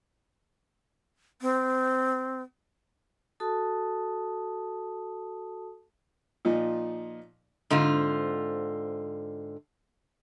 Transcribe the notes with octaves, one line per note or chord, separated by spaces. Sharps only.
C4
F#4 A4 A5 D#6
A#2 F3 D#4
G#2 D3 C4 F4